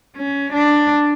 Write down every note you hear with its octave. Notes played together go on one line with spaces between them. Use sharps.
C#4
D4